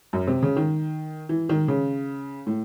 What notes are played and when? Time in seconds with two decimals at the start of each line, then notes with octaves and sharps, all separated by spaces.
0.13 F#2
0.27 C3
0.42 C#3
0.56 D#3
1.29 E3
1.49 D#3
1.68 C#3
2.47 A2